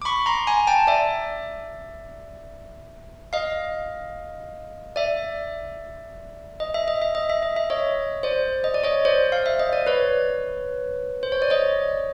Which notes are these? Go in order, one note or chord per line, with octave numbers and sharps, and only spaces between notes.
D6
B5 C#6
A#5 C6
G#5 A#5
G5 A5
D5 E5
D#5 F5
D5 E5
D#5
E5
D#5
E5
D#5
E5
D#5
E5
C#5 D#5
C5 D5
D#5
D5
C#5 D#5
C5 D5
F5
E5
D#5
D5
B4 C#5
C5
C#5
D5
C#5 D#5